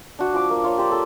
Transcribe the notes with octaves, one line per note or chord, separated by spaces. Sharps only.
D4 F#4
F3 D6
A#3
F4 C#5
G4 C5 D5
A4 C5